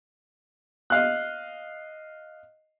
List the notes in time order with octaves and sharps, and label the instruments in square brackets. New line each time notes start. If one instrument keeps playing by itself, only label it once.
[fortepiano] D#5 F5 F#6